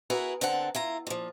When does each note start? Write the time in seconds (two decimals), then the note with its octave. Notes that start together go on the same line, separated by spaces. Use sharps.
0.10 E4 F#4 G#4 A#4 B4
0.41 D3 C4 A#4 F#5 A5
0.75 E4 F4 A#5
1.07 A#2 F3